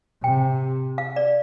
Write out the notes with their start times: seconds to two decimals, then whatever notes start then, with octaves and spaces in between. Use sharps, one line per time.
0.24 C3 G5
0.98 F5
1.16 D5